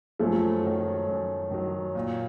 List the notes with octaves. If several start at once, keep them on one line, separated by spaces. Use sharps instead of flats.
F#2 F3 A3
D#3 F#3
F#2
D#3 F#3
A#2